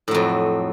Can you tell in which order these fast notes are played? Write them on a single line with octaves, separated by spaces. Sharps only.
A2 F#3 F2